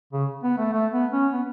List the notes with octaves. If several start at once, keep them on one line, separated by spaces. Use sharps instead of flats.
C#3
B3
A3
A3
B3
C#4
B3